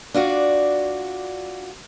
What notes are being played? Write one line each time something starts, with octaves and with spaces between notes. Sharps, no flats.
D4 F4 F#4 D5